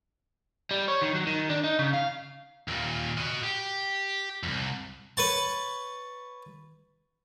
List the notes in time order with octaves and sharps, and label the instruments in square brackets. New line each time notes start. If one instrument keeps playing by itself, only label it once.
[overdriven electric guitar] G3
C#5
D#3
F#3
D#3
D4
D#4
C#3
F5
[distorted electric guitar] D#2 A#2
F#4 D#5
G4
C2 F2
[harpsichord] B4 C#5 A5